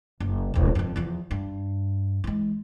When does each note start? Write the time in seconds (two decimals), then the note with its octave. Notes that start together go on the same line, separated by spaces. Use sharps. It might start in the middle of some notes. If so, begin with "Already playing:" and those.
0.20 F#1
0.54 D#1 A1
0.75 F2 D#3
0.96 E2 F3
1.31 G2
2.24 E3 G#3